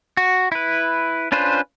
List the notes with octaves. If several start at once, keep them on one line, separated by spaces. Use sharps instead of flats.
F#4
E4 B4
C#4 D4 F4 B4 C5